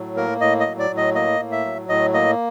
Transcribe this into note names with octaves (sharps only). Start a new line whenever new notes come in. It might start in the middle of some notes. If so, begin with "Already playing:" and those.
Already playing: A2 F#3
A#3 A#4
A2 D#5
D#5
F#3
D5
A2
D#5
A#3 D#5
A2
E5
F#3
A2 D#5
A#3 D#5